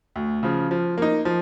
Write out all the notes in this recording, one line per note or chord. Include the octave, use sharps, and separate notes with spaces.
D2
C#3 F3
F3
A#3 D#4
F3